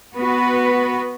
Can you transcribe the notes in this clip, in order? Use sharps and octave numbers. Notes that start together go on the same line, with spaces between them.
B3 F#4 B4